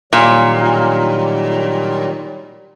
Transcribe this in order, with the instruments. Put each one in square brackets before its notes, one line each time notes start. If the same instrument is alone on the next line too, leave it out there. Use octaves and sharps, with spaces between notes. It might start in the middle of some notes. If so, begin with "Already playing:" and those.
[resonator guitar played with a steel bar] A#2 [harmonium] D#3 F#3 G3